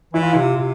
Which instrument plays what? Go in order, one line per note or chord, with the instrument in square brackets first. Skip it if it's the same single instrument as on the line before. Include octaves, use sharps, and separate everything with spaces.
[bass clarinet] E3 [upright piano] E4
[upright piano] F4
[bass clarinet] C3 [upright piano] E4
[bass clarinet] C3